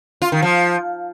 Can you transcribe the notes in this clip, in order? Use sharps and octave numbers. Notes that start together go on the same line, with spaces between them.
F4
D#3
F3